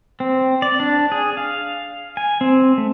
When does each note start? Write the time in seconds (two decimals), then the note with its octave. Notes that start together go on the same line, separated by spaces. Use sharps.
0.20 C4
0.62 D5
0.80 D4
1.12 G#4
1.37 F5
2.17 G#5
2.41 C4
2.78 A3